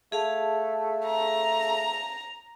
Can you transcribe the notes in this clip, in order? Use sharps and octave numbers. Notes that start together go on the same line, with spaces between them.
A3 G#4 F5 A5
A#5